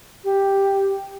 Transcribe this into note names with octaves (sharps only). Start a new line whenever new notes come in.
G4